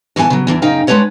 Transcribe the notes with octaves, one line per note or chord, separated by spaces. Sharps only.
B2 E3 B3 G#5 A5
C#3 F#3
E2 E3 D4
F#2 C#3 D#4 F5 G5 A#5
G#3 C#4 D4 B4 C#5 F#5